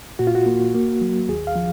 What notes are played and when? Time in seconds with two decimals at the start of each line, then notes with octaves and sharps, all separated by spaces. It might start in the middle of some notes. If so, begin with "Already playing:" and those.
0.19 A#2 F#4
0.27 F4
0.35 F#4
0.46 A#3
0.74 A#3
1.01 F#3
1.29 D#2 G#4
1.47 F5
1.56 F3